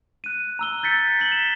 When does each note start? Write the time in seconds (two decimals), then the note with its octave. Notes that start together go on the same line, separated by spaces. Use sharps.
0.24 F#6 D#7
0.59 A#5 E6 G7
0.83 G6 A6 B6 C#7
1.20 B6 F#7 G7
1.32 E7